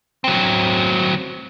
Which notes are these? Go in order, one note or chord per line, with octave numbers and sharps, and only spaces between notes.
F#3 C4